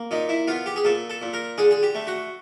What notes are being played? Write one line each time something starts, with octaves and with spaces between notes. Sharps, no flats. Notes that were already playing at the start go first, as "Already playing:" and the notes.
Already playing: A#3
A#2 D#4
E4
B3 F4
G4
G#4
A#2 A4
A4
A#2
A#4
D3 G#4
G#4
G4
A3
F#4